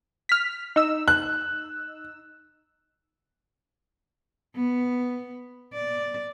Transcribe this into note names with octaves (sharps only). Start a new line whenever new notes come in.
F6 B6
D#4 E6
F#6
B3
D5